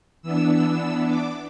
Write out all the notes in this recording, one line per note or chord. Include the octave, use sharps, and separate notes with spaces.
E3 B3 D4 E6
E6
D6